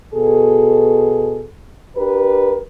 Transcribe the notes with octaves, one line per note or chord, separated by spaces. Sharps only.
B2 G#4 A4
D4 G4 A#4 B4